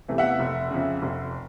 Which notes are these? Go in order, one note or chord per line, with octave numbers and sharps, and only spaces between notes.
E2 C3 E3 A3
E5 F#5
F1
F2 C#3
F1